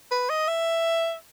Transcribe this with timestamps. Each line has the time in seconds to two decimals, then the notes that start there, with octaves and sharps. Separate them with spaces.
0.11 B4
0.30 D#5
0.48 E5